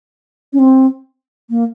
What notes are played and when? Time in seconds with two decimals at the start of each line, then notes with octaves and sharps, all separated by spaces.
0.53 C#4
0.59 C4
1.50 A#3